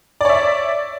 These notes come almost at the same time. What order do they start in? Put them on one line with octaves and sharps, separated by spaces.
D5 C#5 E5